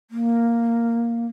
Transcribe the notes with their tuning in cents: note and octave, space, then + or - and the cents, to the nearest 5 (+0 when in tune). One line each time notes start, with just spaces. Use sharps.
A#3 -5